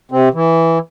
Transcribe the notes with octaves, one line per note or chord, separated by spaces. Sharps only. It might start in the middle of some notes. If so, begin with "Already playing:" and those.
C3 C4
E3